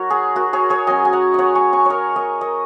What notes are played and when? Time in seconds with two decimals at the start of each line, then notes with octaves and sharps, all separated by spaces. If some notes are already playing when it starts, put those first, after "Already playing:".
Already playing: F#3 D#4 F#4 A#4 C#5
0.10 G#4
0.36 F#4 A#4
0.53 G#4 C#5
0.70 G#4 C#5
0.87 F#3 C#4 D#5 G#5
1.05 G#5
1.13 F#5 A#5
1.34 C#5 D#5 F#5
1.55 G#5 C#6
1.73 G#5 C#6
1.86 A#4 C#5 D#5
2.16 A#4 D#5
2.41 A#4 D#5